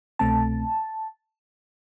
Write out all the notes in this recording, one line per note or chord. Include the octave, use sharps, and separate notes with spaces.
C2 B2 A3 C4 A5